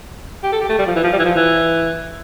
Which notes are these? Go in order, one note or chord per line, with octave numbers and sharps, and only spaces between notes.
G4
A4
G4
A3
G3
F3
E3
F3
G3
E3
F3
E3